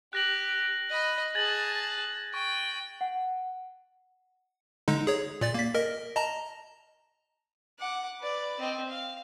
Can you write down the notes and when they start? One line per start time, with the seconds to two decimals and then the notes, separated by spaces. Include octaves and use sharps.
0.13 G4 F#6 A#6 F#7
0.90 D#5 B5
1.35 G#4 A5 G#6 A6 F#7
2.34 G5 C#6
3.01 F#5
4.88 D3 G#3 D#4
5.07 G#4 C#5
5.41 A#2 D5 A6
5.54 A#3 B6
5.75 A#4 D#5
6.15 D#5 A5 A#5
7.79 F#5 D6
8.19 B4 D5
8.59 C4 D#5
8.90 F5